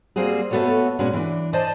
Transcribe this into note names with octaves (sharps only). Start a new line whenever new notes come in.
G3 A#3 C4 F#4 G#4
A3 B3 F#4 A4 C#5
A#2 G#3 B3 C#4 F#4 B4
E3 D4
C5 D5 D#5 G#5 A5